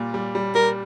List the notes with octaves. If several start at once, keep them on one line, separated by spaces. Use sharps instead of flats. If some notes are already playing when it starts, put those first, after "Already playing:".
Already playing: A#2 G3
G3
G3
G3 A#4